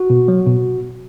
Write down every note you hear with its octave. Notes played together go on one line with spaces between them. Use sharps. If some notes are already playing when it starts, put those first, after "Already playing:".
Already playing: F#4
B2
F#3
B2